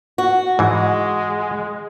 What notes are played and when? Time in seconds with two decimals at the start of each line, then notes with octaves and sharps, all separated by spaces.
0.18 F#4
0.59 G#2 E3 G#3